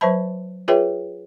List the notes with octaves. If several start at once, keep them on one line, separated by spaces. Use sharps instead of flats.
F#3 B4 C5 E5 A5 B5
F4 G#4 B4 C#5 E5 G5